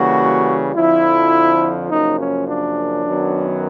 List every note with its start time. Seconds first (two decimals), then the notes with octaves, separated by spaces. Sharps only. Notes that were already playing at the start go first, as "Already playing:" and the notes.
Already playing: C#3 E3 G3 A#3 F#4
0.75 F2 D3 F3 E4
1.90 F#2 C#3 F3 A#3 D#4
2.19 C#4
2.47 D4
3.04 F#2 D#3 F#3 B3